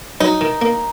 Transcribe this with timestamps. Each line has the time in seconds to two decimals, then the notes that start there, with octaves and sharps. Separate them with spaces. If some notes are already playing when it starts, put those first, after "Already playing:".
0.20 F#3 D#4
0.41 D#3
0.61 A#3